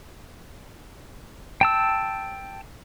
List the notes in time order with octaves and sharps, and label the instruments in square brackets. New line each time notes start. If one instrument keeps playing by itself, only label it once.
[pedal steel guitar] G5 A5 E6